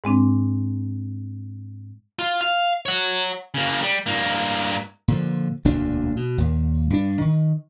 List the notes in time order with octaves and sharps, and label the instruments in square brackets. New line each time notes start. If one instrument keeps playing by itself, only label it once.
[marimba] G#2 G#3 C4 D4
[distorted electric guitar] F4
F5
C#5 F#5
C#3 A#3
G3
G2 A#3
[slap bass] A#2 D3 F3
E1 D2 A#2 D4
B2
D#2 A#2
G2 D4
D#3